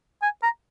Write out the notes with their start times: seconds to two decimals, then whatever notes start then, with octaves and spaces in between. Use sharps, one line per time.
0.22 G#5
0.43 A#5